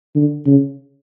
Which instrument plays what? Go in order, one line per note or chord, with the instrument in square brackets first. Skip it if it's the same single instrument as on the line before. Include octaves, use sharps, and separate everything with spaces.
[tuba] D3
C#3